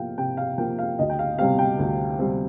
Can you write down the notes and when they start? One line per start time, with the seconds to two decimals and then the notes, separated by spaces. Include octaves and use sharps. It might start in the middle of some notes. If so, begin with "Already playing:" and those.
Already playing: C3 F3 A#3 F5 G5
0.18 C3 G5
0.37 F5
0.58 F3 A#3 G5
0.79 F5
0.99 D2 D#5
1.09 G5
1.19 F5
1.39 C3 G3 C4 F5
1.59 G5
1.78 D2
2.19 C3 G3 C4